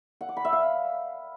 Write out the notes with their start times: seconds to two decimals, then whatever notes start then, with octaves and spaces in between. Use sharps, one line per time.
0.21 F#5
0.29 D6
0.37 B5
0.45 E5
0.53 F5